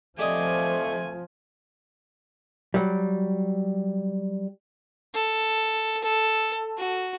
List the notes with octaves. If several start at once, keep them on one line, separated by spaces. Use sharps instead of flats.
F3 A3 C4 G4 D5 D#5 G#5
F#3 G3
A4
A4
F#4